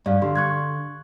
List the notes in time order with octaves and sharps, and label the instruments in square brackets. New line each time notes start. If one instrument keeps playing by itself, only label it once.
[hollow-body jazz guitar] G2 [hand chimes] D5 F5
[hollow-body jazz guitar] D3 [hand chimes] G4 C6
[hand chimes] C#6 F#6 G#6